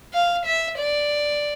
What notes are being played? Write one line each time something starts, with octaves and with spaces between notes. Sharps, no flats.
F5
E5
D5